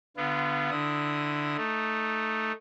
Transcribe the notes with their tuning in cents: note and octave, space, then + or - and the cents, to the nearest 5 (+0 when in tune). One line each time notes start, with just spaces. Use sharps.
D3 +0 B3 +0 F4 -30
D3 +10 E4 +0 D#6 +10
A3 +0 D#4 +0